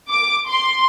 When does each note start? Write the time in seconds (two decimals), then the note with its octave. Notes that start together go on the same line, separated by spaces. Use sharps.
0.10 D6
0.49 C6